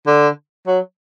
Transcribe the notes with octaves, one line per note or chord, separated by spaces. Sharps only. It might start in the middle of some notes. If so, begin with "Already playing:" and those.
D3
F#3